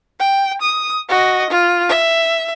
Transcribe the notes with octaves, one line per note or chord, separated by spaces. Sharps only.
G5
D#6
F#4 D#5
F4
E5